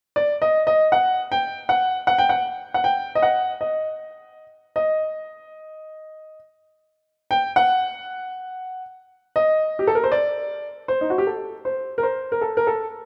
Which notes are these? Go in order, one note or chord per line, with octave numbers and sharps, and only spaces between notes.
D5
D#5
D#5
F#5
G5
F#5
F#5
G5
F#5
F#5
G5
D#5
F#5
D#5
D#5
G5
F#5
D#5
G4
A4
A#4
C5
D5
C5
D#4
F#4
G4
A4
C5
A#4
C5
A#4
A4
A#4
A4